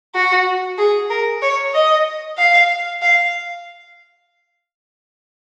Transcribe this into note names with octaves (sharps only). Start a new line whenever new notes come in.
F#4
G#4
A#4
C#5
D#5
F5
F5